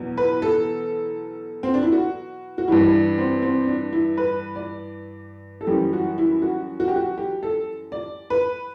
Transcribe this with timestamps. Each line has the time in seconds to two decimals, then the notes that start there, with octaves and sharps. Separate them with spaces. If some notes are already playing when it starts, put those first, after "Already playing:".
Already playing: E2 B2 F#3
0.18 B4
0.42 A4
1.63 C4
1.74 D4
1.83 E4
1.92 F#4
2.58 F#4
2.67 G2 E3 G3 E4
2.93 D4
3.18 C4
3.42 C4
3.67 D4
3.93 E4
4.17 B4
4.55 D5
5.61 A4
5.67 F#2 E3 G3 G4
5.93 F#4
6.18 E4
6.42 F#4
6.80 F#4
6.88 G4
6.96 F#4
7.18 G4
7.43 A4
7.92 D5
8.30 B4